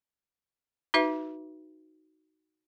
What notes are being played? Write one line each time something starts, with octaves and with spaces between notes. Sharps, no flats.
D#4 F#4 B4 E5